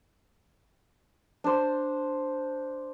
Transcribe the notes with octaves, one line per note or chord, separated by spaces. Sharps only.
D4 C5